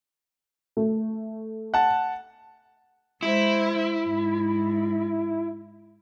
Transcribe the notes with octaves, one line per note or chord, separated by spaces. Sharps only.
A3
F#5 A5
G#3 E4 C5
G#2